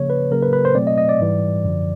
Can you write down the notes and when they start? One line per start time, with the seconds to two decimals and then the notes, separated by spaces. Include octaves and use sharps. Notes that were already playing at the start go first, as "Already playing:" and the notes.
Already playing: C#3 F3 A#3 C#5
0.10 B4
0.31 C#3 F#3 A#3 A#4
0.43 B4
0.53 B4
0.65 C5
0.75 B2 F#3 A3 C4 D5
0.87 D#5
0.98 D#5
1.09 D5
1.20 G#2 E3 G3
1.64 F#2 D3 F3